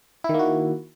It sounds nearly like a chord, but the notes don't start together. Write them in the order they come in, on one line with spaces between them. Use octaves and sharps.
E4 D#3 A#3 F#4